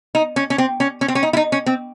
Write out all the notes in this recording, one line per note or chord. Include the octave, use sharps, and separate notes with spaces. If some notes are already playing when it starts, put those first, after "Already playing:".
D#4
C#4
C#4
C4
C#4
C#4
C4
C#4
D#4
E4
D#4
C#4
C4